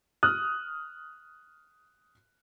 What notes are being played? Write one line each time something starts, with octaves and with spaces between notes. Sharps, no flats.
D#6 F6 F#6